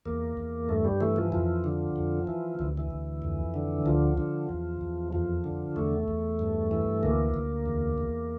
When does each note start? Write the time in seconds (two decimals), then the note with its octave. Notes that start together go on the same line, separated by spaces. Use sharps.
0.06 E2 A#3
0.37 E2
0.69 G2 A3
0.85 G3
1.01 E3 A3
1.16 F3
1.32 F2 F3
1.64 D3
1.96 F2
2.27 E3
2.59 D2 E3
2.77 E3
2.90 D2
3.22 F2
3.54 D3
3.86 D2 F3
4.18 D3
4.49 E2
4.81 E2
5.13 F2 F3
5.44 D3
5.76 E2 A3
6.08 E2
6.39 G2
6.71 E3
7.03 D2 A#3
7.34 D2
7.66 E2
7.98 E2